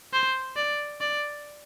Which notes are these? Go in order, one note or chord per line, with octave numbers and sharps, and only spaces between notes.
C5
D5
D5